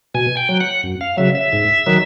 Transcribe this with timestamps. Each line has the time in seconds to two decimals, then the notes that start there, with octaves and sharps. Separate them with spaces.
0.14 B2 G#5
0.37 G5
0.49 F#3
0.60 F#5
0.83 F#2
1.01 F5
1.17 C#3 F#3 E5
1.35 E5
1.52 G#2
1.86 D#3 F#3